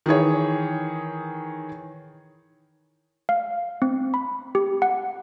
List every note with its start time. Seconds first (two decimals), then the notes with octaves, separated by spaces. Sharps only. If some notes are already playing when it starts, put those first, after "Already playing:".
0.06 D#3 E3 G#4 C#5
3.29 F5
3.82 C4
4.14 B5
4.55 G4
4.82 F#5